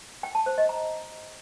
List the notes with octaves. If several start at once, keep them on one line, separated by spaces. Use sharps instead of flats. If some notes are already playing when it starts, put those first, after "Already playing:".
G5
A5
C5
D#5
A#5